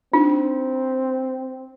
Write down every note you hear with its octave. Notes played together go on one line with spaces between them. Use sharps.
C4 D4 D#4 F4